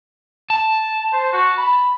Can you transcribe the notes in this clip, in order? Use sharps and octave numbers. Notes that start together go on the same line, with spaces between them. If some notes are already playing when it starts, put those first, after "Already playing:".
A5
C5
F#4
B5